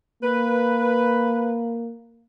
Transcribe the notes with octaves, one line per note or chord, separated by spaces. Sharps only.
A#3 B4